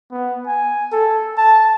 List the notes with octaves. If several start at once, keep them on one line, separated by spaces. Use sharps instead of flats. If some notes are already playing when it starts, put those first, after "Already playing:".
B3
G#5
A4
A5